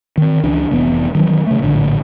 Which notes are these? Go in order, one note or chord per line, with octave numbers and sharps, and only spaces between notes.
D#3 C4
C#2 E3 C#4 D4
F1 E3 B3
D#3 E3 F#3 C#4
C#3 A3
A#1 A2 D3